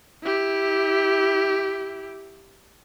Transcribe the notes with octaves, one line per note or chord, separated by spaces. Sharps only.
E4 G4